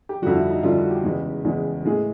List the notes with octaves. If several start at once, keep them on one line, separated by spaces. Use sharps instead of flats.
G4
F2 D3 G3 F#4
E4
D#4
F2 D3 G3 F4
F#4
G4
E2 C#3 E3 G#3
E2 C#3 E3 G#3
A2 E3 G#3 G#4